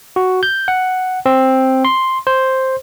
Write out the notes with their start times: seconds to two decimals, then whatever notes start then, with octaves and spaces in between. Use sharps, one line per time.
0.16 F#4
0.43 G6
0.68 F#5
1.26 C4
1.85 C6
2.27 C5